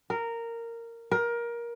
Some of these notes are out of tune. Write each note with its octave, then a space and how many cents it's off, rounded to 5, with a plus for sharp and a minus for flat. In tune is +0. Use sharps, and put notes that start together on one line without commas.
A#4 -10
A#4 +20